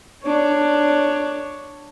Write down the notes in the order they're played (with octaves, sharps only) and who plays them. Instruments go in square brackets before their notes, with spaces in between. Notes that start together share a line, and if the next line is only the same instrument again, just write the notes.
[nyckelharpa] D4 C#5